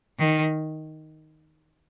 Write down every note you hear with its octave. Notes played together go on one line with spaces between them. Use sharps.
D#3